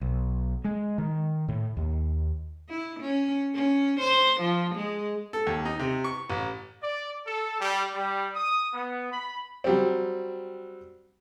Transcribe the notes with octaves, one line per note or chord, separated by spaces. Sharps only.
B1
G#3
D#3
A2
D#2
E4
C#4
C#4
C5
F3
G#3
A4
D#2
D#4
C3
C#6
A1
D5
A4
G3
G3
D#6
B3
B5
F#3 G3 C4